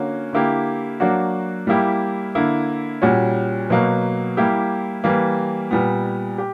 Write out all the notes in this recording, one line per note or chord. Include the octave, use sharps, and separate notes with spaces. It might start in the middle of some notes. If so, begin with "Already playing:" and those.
Already playing: D3 A#3 C#4 F#4
D3 A#3 E4 G4
F#3 A#3 D4 F#4
G3 A#3 E4 G4
D3 A#3 E4
A#2 G3 C#4 F#4
B2 F#3 A#3
G3 A#3 E4 G4
E3 G3 A#3
A#2 G3 B3
G4